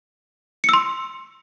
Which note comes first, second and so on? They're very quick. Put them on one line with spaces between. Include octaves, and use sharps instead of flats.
C#7 E6 C6